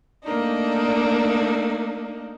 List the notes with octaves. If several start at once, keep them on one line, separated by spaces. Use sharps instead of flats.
A3 A#3 D4 D#4